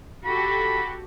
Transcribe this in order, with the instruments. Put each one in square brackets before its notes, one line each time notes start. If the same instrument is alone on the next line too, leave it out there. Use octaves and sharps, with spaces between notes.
[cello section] F#4 G4 A4 [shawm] B5